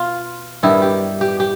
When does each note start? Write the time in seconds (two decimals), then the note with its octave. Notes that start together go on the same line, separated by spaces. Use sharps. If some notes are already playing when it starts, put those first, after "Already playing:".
Already playing: B2 F4
0.63 G2 D#3 G3 B3 E4
0.82 G4
1.21 G4
1.40 G4